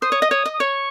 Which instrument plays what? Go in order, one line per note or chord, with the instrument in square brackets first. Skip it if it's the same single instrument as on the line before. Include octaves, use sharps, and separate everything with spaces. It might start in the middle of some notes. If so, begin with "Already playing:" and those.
[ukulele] C5 [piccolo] D#6
[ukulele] C#5
D#5
C#5
D#5
[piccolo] D#6
[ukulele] C#5 [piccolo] C#6